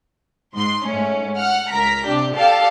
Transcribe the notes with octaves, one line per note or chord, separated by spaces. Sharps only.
G#2 C6
G#2 A3 C#4
F#5 F6
C#2 A#4 A#5 B6
C3 D4 G4
G4 A4 D5 F5 A5